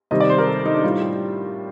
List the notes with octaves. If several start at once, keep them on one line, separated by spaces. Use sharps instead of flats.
C3 D#3 G3 D#5
D5
C5
A#4
A4
D#4
D4
A2 G3 F4
G4